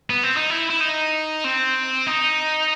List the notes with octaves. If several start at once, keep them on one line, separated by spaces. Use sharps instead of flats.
B3
C4
D#4
E4
E4
D#4
C4
D#4